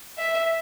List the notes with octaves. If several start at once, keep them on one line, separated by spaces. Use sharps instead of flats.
E5